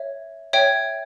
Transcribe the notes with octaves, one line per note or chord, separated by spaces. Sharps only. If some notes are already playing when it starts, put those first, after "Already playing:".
Already playing: C#5 E5
C#5 E5 G5